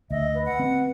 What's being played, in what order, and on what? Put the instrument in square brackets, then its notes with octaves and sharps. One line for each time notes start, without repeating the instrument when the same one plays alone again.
[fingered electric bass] D2 [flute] D#5 [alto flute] E5
[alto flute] B4
[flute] F#5
[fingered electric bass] C4